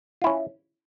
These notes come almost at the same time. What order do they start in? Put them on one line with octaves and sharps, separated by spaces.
F4 E4 C#4